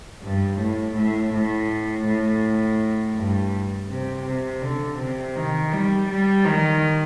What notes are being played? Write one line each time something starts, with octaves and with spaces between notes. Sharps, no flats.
G2
A2
A2
A2
A2
G2
C3
C3
D3
C3
D#3
G3
G3
D#3